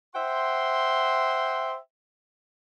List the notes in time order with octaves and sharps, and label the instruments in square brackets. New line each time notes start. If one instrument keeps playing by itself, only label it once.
[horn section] C5 E5 F#5 G5 C6